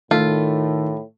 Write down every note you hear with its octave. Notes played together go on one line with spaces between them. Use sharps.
A2 D#3 A3 F4